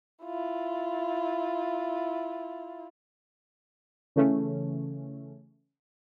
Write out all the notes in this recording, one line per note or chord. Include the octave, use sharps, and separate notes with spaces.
E4 F4
C#3 E3 A3 C#4